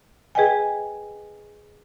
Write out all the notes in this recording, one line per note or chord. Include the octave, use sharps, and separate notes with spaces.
G#4 B4 D#5 G5 G#5